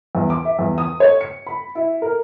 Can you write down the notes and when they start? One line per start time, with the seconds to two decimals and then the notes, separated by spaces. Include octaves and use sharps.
0.15 E2
0.30 D6
0.45 E5
0.59 E2
0.78 D#6
1.00 C#5
1.21 C#7
1.47 B5
1.75 E4
2.02 A#4